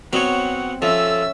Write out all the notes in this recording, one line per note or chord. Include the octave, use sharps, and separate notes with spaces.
F#3 B3 C4 C#5 F#5
F3 C#4 A4 E5 E6